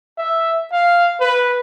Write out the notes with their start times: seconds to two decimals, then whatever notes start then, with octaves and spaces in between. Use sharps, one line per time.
0.18 E5
0.72 F5
1.20 B4